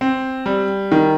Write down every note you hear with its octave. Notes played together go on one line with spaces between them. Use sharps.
C4
G3
D#3